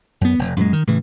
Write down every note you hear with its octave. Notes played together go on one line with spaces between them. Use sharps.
F#2 B3
F1
F#2 A#2 F3 G#3
D#3
A2 C#3 E3